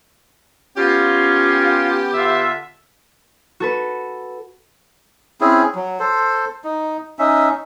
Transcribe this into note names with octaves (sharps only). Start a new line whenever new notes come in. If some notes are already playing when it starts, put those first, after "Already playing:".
B3 C#4 F4 G4
D3 F4 E5
F#4 A4 B4
C4 C#4 E4 G#4
F#3
A4 C5
D#4
C#4 D#4 E5